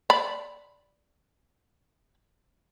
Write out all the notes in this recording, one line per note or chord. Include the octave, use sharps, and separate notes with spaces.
D5 B5